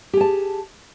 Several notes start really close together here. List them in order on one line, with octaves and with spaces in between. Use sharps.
G4 G#4 A5